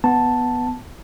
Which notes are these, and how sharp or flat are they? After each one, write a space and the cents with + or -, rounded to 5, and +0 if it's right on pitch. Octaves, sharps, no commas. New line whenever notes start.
B3 +0 A5 +0